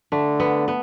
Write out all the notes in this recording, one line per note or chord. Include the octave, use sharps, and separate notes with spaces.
D3 A3
B3
B3